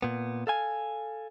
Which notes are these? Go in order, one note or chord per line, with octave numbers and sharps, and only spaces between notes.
A#2 B3
A4 F5 G#5